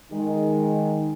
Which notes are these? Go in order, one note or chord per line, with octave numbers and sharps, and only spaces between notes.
D#3 G#3 D#4